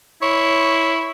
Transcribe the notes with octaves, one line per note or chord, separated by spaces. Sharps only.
E4 C#5